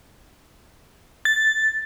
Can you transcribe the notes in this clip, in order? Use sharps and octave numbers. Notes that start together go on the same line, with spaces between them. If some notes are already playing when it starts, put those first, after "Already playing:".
A6